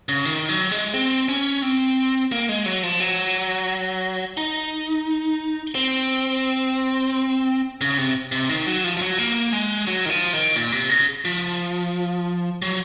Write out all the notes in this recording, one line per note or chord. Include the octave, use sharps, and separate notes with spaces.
C#3
D#3
F#3
G#3
C4
C#4
C4
A#3
G#3
F#3
F3
F#3
D#4
C4
C#3
C3
C3
D#3
F#3
F3
F3
F#3
A#3
G#3
F#3
D#3
F3
D#3
A#2
C3
C#3
F3
F#3